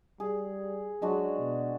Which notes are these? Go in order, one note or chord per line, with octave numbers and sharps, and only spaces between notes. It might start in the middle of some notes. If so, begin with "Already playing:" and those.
G3 G#4
F#3 G#3 D4 F#4
B2